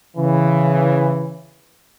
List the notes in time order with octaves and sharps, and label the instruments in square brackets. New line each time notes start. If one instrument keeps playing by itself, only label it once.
[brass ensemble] C#3 E3